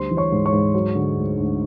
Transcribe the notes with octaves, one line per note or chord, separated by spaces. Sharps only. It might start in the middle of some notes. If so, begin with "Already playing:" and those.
Already playing: D2 G3 C5 C6
E3
C#5 C#6
G#2
C#5 C#6
G#2
F#3
D3
D2
D2